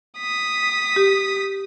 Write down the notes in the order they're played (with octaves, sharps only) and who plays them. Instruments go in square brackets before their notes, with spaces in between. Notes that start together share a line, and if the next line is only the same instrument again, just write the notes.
[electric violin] D#6 B6
[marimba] G4